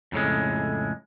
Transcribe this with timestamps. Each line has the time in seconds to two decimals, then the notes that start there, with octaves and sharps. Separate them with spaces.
0.12 F2 A2 C#3 G#3